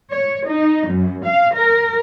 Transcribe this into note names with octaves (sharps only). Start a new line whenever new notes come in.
C#5
D#4
F#2
F5
A#4